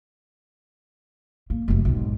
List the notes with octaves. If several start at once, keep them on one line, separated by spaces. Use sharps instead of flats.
A#3
F1 F#2
B1 G#2